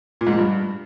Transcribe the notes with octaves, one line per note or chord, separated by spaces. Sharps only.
A#2
G#2
F3
G2